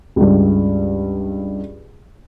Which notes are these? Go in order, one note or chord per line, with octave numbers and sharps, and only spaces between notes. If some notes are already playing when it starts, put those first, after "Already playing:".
C#2 G2